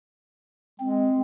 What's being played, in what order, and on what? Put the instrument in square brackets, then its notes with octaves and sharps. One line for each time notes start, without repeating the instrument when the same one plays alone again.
[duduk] G#3 [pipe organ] C4